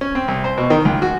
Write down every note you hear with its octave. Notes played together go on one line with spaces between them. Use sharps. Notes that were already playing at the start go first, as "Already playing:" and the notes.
C#4
C4
C2
C5
B2
D#3
C#2
F#4